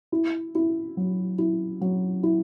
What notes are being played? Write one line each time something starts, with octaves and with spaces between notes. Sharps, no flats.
E4
E4
F#3
E4
F#3
E4